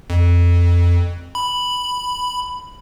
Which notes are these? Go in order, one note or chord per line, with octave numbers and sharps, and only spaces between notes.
F2
B5